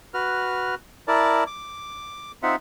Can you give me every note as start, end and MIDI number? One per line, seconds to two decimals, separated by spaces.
0.14 0.75 66
0.14 0.75 71
0.14 0.75 89
1.08 1.44 64
1.08 1.44 70
1.08 1.44 74
1.08 1.44 81
1.47 2.32 86
2.43 2.56 60
2.43 2.56 63
2.43 2.56 65
2.43 2.56 76
2.43 2.56 78